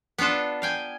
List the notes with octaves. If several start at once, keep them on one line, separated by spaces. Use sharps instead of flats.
B3 D4 F4 A4 A5
F5 G5 G#5